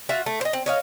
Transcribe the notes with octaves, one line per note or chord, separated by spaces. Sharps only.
F4 F#4 E5
A3
C5 D#5
C4
C#5 D#5 F5